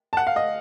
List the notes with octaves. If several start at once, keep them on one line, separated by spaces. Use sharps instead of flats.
A5
F#5
F5
D#5